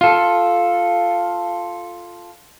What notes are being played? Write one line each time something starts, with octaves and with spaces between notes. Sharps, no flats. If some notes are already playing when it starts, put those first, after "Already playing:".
F4 A4